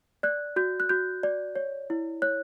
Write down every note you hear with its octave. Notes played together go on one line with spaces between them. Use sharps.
D5 F#6
F#4 G6
F#6
F#4 G6
D5
C#5
E4
C#5 F#6